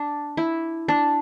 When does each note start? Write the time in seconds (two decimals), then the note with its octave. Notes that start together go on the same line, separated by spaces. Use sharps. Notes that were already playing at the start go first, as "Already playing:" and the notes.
Already playing: D4
0.37 E4
0.88 D4